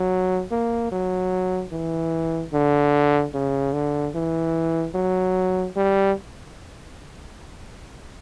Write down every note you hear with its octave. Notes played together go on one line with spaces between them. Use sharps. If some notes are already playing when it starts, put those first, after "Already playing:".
Already playing: F#3
A#3
F#3
E3
D3
C#3
D3
E3
F#3
G3